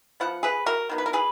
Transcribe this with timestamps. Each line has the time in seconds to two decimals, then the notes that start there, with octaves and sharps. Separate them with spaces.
0.20 F3 B3 F#5
0.43 G#4 B4
0.66 F#4 A#4
0.89 D#3 F#3 B3
0.98 B4
1.06 A#4
1.13 G#4 B4